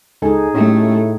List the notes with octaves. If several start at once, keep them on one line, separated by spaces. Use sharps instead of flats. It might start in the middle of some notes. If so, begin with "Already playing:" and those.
C#2 D#4 G#4 A4 G#5
A2 A3 C#4 G4